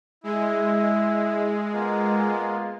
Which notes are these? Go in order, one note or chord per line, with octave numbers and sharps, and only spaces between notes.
G#3 E4
A#3 B3 F4